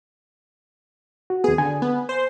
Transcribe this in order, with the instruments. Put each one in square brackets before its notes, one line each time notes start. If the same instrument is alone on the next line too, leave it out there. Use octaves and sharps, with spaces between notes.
[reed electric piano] F#4
[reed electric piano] D#2 B3 [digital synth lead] G#4
[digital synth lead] D3 [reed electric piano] G#5
[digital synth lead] B3
C5